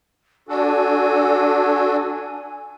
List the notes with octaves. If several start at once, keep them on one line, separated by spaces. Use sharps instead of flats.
D4 F#4 A4 G#5